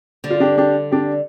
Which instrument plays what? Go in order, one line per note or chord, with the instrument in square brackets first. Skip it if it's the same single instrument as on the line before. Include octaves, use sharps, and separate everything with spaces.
[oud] D3 G3
[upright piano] F4
D4 G4
D4 G4
D4 G4